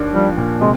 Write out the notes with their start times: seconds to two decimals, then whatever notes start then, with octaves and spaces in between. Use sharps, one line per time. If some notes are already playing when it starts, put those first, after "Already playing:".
Already playing: D#2 A#3 D4
0.13 F3 G3
0.37 A#2
0.61 C3 G#3